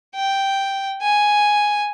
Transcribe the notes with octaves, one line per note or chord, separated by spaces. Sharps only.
G5
G#5